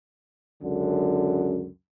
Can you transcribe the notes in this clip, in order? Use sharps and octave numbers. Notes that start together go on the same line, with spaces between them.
C#2 F#2 D3